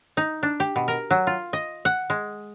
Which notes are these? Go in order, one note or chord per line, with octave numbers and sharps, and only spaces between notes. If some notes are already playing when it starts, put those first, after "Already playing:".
D#4
D4
G4
B2
A#4
F#3
F4
D#5
F#5
G#3